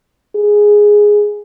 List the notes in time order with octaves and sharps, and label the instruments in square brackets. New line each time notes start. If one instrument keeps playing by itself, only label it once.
[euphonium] G#4